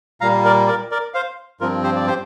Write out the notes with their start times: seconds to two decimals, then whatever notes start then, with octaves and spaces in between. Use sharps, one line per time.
0.21 A#2 G3 A#3 F5 A#5
0.45 A#4 D5
0.67 A#4 D5
0.91 A#4 D5
1.14 C5 F5
1.61 G2 F3 C4 F4 A#4
1.83 G4 C5
1.96 D5
2.07 G4 C5